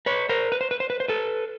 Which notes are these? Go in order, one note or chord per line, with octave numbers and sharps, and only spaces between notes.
B4 C#5
A#4 C5
B4
C5
B4
C5
B4
C5
A4 B4